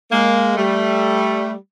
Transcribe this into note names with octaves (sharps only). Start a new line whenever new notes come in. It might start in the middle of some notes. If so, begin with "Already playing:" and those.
G#3 A#3
G3 A3